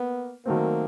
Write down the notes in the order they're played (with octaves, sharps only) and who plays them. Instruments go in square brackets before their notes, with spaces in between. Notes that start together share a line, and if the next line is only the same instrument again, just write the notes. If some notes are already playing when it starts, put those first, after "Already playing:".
Already playing: [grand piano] A#3 [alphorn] B3
[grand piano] D#3 F#3 A3 C4 [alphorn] A#3